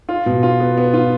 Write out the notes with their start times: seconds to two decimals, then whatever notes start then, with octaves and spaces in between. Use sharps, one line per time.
0.09 F4
0.26 B2
0.43 F4
0.60 B3
0.77 B3
0.94 F4